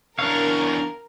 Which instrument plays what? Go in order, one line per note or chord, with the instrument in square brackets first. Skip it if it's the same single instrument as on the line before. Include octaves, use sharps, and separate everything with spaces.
[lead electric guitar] E2 C#5 [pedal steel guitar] D4 F5 [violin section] A#4